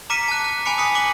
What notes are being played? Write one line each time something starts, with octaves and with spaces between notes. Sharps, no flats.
A#5 D6 F6 B6 C#7 D#7
A5 F#6
F#6
G#5 A5 B5 D6 C#7
D#6 F#6 B6 C#7
D6 B6 D#7 F#7